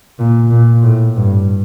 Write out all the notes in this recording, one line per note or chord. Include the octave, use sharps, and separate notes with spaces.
A#2
A#2
A2
G2